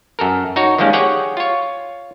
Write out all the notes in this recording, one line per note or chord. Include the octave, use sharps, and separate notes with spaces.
F#2 A4 A#4
D#4 F#4 C#5
D#3 F3 G3 G#3 A#3 C#4
G4 G#4 C#5 F#5 G5
F4 C#5